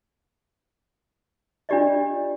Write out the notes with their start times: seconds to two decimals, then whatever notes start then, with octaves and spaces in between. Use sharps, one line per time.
1.69 D4 F4 G4 D5 D#5